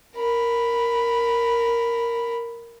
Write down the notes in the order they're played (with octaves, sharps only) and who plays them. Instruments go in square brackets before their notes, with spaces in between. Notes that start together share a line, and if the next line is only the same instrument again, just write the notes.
[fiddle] A#4 B5